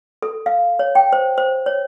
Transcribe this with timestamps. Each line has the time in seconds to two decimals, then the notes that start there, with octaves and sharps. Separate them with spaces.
0.22 A4
0.46 F5
0.79 C#5
0.95 G5
1.13 C5
1.38 C5
1.66 C#5